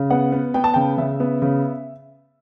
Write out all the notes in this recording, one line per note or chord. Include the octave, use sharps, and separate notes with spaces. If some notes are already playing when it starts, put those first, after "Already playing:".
Already playing: C#3
B3 F#5
B3
B3 G5
A5
C#3 G5
C#3 E5
B3
C#3